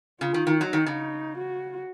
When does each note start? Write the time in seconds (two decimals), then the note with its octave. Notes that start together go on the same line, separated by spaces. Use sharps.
0.21 C#3 F4
0.34 D#3
0.47 D#3
0.61 F#3 D#4
0.73 D#3
0.86 C#3
1.38 F#4